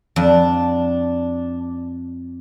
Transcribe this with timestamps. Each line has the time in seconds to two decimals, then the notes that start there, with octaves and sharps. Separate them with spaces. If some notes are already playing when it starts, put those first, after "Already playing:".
0.16 F2 D4